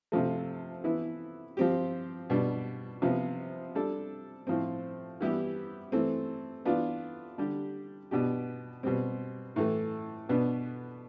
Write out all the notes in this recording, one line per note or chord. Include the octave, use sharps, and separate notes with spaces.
C3 F3 A3
E3 B3 E4
F3 C4 G4
B2 G3 D4
C3 F3 B3
G3 D4 A4
A2 F3 C4
E3 G3 B3 E4 G4
E3 A3 C4
E3 B3 D4 F4
D3 G3 D4 G4
B2 B3 D4 G4
B2 G3 C4
A2 E3 A3
B2 B3 D4